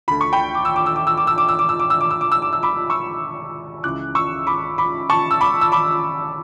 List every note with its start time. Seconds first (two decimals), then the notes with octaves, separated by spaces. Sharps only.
0.08 D2 D3 B5
0.21 C#6
0.33 G5 B5
0.55 D6
0.65 E6
0.76 D6
0.86 E6
0.96 D6
1.07 E6
1.17 D6
1.27 E6
1.38 D6
1.48 E6
1.59 D6
1.69 E6
1.79 D6
1.90 E6
2.01 D6
2.11 E6
2.21 D6
2.32 E6
2.42 D6
2.53 E6
2.63 B5 D6
2.90 C#6 E6
3.83 C#2 C#3 E3 D6 F#6
4.15 C#6 E6
4.47 B5 D6
4.78 B5 D6
5.10 A5 C#6
5.31 E6
5.41 B5 D6
5.61 E6
5.72 B5 D6